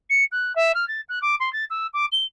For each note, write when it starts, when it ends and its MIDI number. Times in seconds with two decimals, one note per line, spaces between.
0.10 0.24 97
0.32 0.55 90
0.55 0.72 76
0.74 0.87 89
0.88 1.01 93
1.09 1.19 90
1.22 1.35 86
1.40 1.52 84
1.53 1.65 93
1.70 1.87 88
1.93 2.06 86
2.12 2.24 103